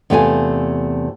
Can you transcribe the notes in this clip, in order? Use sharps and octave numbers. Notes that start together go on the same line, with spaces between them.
E2 C3 A3 F4 G5 G#5